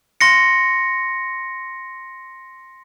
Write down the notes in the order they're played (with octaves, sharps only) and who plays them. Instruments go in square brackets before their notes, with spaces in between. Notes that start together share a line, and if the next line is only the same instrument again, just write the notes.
[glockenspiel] C6 A#6 C#7